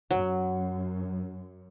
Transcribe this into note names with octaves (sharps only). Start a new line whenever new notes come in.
F#2 F#3